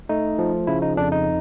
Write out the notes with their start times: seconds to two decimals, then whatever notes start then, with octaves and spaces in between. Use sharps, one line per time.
0.09 A3 D#4
0.39 F3
0.67 C#3 E4
0.82 D#4
0.97 F2 D4
1.12 D#4